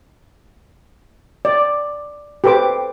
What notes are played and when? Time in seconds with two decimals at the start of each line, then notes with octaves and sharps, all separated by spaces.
1.45 D5
2.44 G4 A4 B4 C5 D6